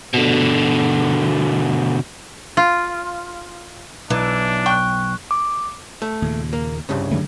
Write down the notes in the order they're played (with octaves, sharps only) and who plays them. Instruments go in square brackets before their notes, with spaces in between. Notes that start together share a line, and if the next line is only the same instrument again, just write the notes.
[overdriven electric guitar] B2 D3
[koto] F4
[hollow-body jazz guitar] B1 [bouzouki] E3 [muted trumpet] D4
[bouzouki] G5 [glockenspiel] C#6 F#6
[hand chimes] D6
[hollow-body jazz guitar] A3
[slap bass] D#2 A#2 C#3
[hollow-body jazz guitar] A#3
C2 G2 C#3
[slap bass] D3 F#3 A3